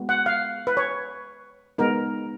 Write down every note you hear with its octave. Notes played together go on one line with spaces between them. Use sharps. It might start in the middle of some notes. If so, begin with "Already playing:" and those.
Already playing: G#3 B3 F#4
F#5
F5
B4
C#5
G#3 B3 D#4 A#4